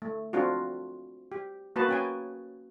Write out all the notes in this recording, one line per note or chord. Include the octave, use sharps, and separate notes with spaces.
A3
C4 D4 F4 F#4
G4
A#3 F#4 B4 A5
C#4 G5 G#5